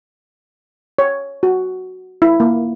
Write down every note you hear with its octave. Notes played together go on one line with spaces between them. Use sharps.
C#5
F#4
E4
A#3